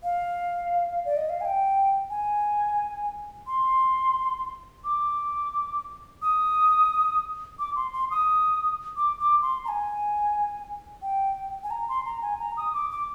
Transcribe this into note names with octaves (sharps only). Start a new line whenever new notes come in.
F5
D5
D#5
F5
G#5
G5
G#5
C6
D6
D#6
D6
C6
C6
D#6
D6
D6
C6
A#5
G#5
G5
G#5
A#5
C6
A#5
G#5
A#5
D#6
D6
D6